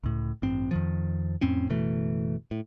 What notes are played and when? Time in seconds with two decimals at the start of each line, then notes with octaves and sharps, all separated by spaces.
0.04 C#2 A2
0.42 A1 G2 C4
0.71 F2 D#3 F3
1.41 F2 A2 C4 C#4
1.69 F#1 B2 E3 A3
2.51 A2